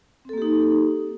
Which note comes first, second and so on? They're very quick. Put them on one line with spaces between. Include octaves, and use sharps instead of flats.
C4 A4 A#3 G4 D#4